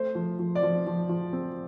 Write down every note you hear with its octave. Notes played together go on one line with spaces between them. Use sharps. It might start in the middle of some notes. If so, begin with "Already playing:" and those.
Already playing: A3 C5
F3
F3
D5
F3
F3
F3
C4